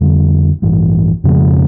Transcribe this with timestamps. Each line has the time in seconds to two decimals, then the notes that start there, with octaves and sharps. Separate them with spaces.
0.01 F2 D3 G3
0.62 A1 G2 E3
1.24 F2 C#3 F3 G#3